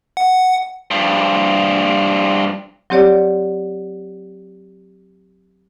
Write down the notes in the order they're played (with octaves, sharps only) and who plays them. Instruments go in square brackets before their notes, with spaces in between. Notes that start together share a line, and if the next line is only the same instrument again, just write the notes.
[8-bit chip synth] F#5
[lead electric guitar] G2 F3
[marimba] F#3 C4 G4 C#5 D5